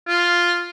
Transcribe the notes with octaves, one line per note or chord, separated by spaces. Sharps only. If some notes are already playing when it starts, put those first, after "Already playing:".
F4